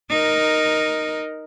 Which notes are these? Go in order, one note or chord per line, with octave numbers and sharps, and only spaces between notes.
D#4 A#4